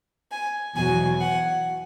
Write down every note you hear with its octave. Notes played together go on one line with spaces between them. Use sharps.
G#5
E2 B2 F#3 G#5
F#5